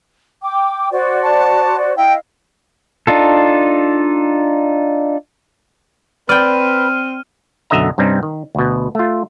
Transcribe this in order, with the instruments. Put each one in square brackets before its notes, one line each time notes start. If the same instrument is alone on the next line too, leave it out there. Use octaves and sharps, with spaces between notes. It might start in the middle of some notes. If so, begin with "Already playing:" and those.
[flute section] G5 D6
F#4 C5 D5
[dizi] A5
[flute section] E4 D#5 F5 [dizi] G5
[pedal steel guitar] D4 D#4 F4 A4
[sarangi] C4 [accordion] B4 [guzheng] D5 G5 [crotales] F6 D#7
[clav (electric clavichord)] B1 F#2 D3 D#5 E5 A#5
G2 C3 G3 C4 C#4 D#4
D#3
D2 B2
A3 F4